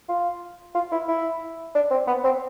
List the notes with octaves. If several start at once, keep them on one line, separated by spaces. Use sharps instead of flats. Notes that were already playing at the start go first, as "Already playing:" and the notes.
F4
F4
E4
E4
D4
C4
B3
C4